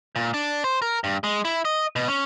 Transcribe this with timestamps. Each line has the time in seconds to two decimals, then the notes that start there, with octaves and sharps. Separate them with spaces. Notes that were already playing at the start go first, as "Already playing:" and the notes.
0.16 A#2
0.34 D4
0.64 C5
0.82 A#4
1.04 G2
1.24 G#3
1.45 E4
1.65 D#5
1.96 B2
2.08 C#4